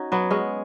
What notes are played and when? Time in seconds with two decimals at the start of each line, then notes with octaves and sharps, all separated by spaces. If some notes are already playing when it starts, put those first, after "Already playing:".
Already playing: C#4 D#4 F#4
0.12 F#3 B3
0.31 G#3 C#4